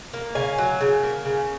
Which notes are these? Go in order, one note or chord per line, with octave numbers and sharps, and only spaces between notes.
A#3
C#3 F5 G#5
F#3
C#3
A#3
C#3